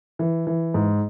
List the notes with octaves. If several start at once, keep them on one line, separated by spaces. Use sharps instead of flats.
E3
E3
G#2